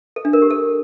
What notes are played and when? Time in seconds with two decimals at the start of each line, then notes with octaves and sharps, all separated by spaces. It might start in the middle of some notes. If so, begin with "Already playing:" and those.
0.16 A4
0.25 D4
0.33 A#4
0.42 G4
0.50 A4